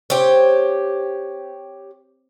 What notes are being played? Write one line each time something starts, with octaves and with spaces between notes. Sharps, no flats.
C4 G4 C#5